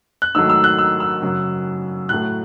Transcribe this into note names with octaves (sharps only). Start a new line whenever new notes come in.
F#6
G#2 D#3 F#3 A3 E6
E6
F#6
E6
E6
F#2 C#3 F#3
A2 F#3 A3 F#6